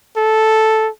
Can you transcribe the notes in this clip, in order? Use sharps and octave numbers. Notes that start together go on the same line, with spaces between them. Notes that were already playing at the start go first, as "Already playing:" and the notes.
A4